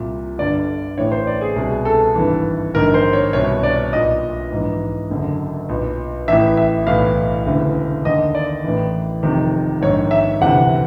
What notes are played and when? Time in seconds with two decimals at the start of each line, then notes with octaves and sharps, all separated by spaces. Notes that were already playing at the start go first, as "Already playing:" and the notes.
Already playing: C2 A#2
0.38 G1 G2 D3 D5
0.98 A1 A2 E3 C#5
1.12 C5
1.27 D5
1.41 G#4
1.56 C2 B2 G#4
1.85 A4
2.15 G#1 G2 E3
2.74 A#1 G#2 D#3 A#4
2.94 C5
3.13 C#5
3.33 C2 B2 C#5
3.63 D5
3.93 B1 A#2 D#5
4.51 A#1 G#2 E3
5.10 F#1 F#2 D3
5.69 B1 A#2
6.28 A1 A2 E3 E5
6.57 E5
6.87 B1 A2 E3 F5
7.46 E1 D2 C#3 E3
8.05 D#2 D3 D#5
8.35 D5
8.64 A1 A2 E3
9.23 F1 F2 C3 D#3
9.82 A#1 G#2 D#3 C#5
10.11 E5
10.41 E1 D2 C3 E3 F#5